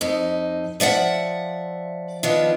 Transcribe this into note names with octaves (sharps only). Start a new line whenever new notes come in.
F2 D#4
F3 D5 E5 F#5
D#3 F3 B3 D4